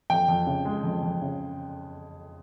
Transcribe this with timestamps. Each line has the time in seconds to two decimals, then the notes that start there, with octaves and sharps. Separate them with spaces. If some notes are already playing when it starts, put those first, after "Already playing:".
0.10 F2 G5
0.28 F2
0.47 C#3
0.65 G#3
0.84 F2
1.03 F2
1.22 C#3